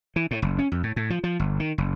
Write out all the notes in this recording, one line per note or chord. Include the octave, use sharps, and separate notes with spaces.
E3
A2
F#1
C#4
F2
A2
A2
F3
F3
G1
D#3
F#1